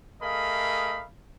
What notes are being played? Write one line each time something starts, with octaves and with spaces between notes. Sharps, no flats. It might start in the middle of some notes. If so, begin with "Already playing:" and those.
A3 G#4 A#4 D#5 F5 B5